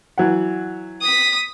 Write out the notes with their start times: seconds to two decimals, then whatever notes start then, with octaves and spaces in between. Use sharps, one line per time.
0.18 E3 F#3 F#5
1.01 D#6 B6